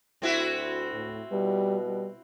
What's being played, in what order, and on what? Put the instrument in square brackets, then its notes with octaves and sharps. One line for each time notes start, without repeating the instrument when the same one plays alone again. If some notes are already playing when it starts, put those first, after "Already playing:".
[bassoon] D2 [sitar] C4 E4 F#4
[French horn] A2
[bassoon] B2 [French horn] G3
[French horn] G3